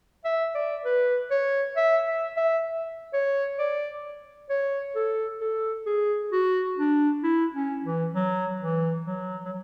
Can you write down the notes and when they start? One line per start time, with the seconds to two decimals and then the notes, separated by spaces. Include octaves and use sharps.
0.25 E5
0.55 D5
0.85 B4
1.31 C#5
1.77 E5
2.07 E5
2.37 E5
3.13 C#5
3.59 D5
4.49 C#5
4.95 A4
5.41 A4
5.86 G#4
6.32 F#4
6.78 D4
7.23 E4
7.54 C#4
7.84 E3
8.14 F#3
8.60 E3
9.06 F#3
9.45 F#3